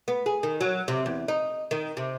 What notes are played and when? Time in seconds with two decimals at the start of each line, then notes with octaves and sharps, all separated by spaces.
0.08 B3
0.26 G#4
0.43 D#3
0.61 F#3
0.88 C3
1.06 E2
1.28 D#4
1.71 D#3
1.97 C3